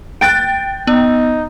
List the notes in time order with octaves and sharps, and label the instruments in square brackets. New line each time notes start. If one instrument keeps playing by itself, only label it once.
[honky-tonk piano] G5 A6 [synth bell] F#6 D7
[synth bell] B3 [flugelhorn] D#4